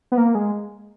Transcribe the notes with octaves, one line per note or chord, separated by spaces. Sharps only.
B3
A#3
G#3